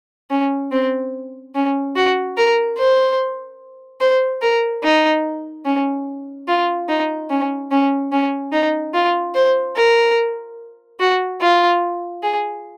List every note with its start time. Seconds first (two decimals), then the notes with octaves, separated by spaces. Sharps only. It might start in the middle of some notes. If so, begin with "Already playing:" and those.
0.30 C#4
0.72 C4
1.55 C#4
1.96 F#4
2.37 A#4
2.78 C5
4.01 C5
4.42 A#4
4.83 D#4
5.66 C#4
6.48 F4
6.89 D#4
7.30 C#4
7.71 C#4
8.12 C#4
8.53 D#4
8.94 F4
9.35 C5
9.76 A#4
11.00 F#4
11.41 F4
12.23 G#4